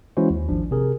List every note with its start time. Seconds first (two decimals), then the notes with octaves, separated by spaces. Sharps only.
0.17 E3 G#3 C#4 E4 F#4 C5
0.30 D#2
0.49 G#1 F3 D4
0.71 C3 G#4 A#4